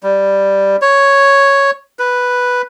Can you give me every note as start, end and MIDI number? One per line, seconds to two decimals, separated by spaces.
0.03 0.76 55
0.82 1.71 73
1.99 2.62 71